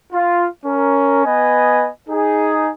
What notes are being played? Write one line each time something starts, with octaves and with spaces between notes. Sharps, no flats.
F4
C#4 A#4
B3 B4 D#5 G#5
D#4 G#4